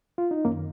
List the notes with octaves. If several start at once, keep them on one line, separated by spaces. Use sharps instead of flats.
F4
D#4
F#2 D#3 A#3 C#4